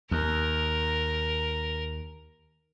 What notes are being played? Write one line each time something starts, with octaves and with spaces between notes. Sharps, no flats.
D#2 A#4